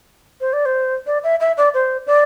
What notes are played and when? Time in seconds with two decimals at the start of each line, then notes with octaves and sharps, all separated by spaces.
0.41 C5
0.53 D5
0.66 C5
1.07 D5
1.24 E5
1.40 E5
1.57 D5
1.74 C5
2.07 D5